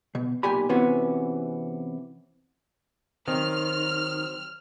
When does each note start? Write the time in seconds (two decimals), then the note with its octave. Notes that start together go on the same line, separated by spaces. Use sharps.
0.15 B2
0.43 B1 A#2 G4 G#5 B5
0.69 C3 E3 B3 C#4 F#4
3.28 D#3 F#3 C4 F6